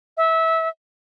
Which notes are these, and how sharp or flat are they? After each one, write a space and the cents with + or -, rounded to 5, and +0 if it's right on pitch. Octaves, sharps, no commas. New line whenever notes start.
E5 -20